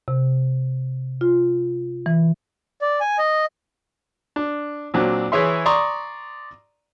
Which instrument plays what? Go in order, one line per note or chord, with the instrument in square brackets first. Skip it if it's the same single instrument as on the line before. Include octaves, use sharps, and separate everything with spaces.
[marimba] C3
F4
E3
[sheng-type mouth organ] D5
G#5
D#5
[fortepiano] D4
A#2 F#3 C4 D4
E3 E4 G#4 C#5 E5 C6
D5 A#5 C6 C#6 D#6